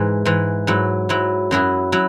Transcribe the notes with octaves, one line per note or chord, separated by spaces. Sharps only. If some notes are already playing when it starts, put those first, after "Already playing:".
Already playing: G#2 E3 G#3
G#2 E3 G#3
G#2 F#3 E4
G#2 F#3 E4
F#2 F#3 E4 G#4
F#3 E4